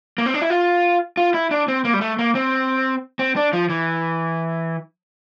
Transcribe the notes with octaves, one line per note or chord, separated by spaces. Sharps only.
A#3
C4
D4
E4
F4
F4
E4
D4
C4
A#3
G3
A3
A#3
C4
C4
D4
F3
E3